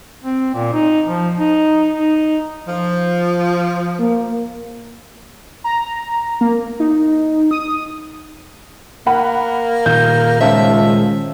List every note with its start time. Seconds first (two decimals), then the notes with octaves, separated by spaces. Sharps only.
0.24 C4
0.55 A#2
0.73 D#4
1.05 F3
1.39 D#4
1.98 D#4
2.68 F3
3.99 A#3
5.64 A#5
6.41 A#3
6.80 D#4
7.51 D#6
9.07 A#3 F#5 B5
9.86 A#2 D#3 G6
10.41 C#2 C5 E5 F5 A5